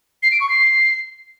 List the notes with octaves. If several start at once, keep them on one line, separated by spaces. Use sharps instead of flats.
C7
D7
C#6
C7